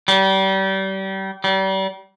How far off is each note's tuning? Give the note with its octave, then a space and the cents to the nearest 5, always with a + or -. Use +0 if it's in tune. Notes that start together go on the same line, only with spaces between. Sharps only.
G3 -30
G3 -35